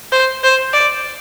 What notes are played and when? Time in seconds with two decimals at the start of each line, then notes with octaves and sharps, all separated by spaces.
0.12 C5
0.43 C5
0.73 D5